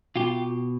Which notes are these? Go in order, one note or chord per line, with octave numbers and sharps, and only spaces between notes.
B2 F4 G4